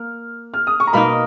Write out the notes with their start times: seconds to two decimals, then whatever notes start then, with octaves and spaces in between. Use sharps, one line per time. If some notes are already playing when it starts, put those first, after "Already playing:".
Already playing: A#3 F6
0.54 F6
0.67 D#6
0.80 C#6
0.87 A#5
0.93 B2 A#3 D#4 B5